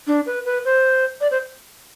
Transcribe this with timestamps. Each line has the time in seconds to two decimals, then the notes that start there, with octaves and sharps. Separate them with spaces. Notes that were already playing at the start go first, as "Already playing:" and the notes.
0.07 D4
0.26 B4
0.45 B4
0.65 C5
1.21 D5
1.31 C5